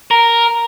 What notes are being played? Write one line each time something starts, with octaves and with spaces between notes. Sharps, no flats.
A#4